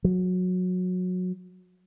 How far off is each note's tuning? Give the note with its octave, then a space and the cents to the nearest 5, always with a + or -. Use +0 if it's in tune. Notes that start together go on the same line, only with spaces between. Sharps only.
F#3 -20